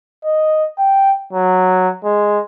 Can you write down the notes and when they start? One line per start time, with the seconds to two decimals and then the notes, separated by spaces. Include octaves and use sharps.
0.25 D#5
0.78 G5
1.33 F#3
2.04 G#3